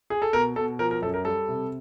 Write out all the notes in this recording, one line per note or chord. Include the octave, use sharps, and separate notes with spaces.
G#4
A4
B2 A#4
B2 A4
F3 A#4
A#4
F#2 A4
A#4
G3 A4
C3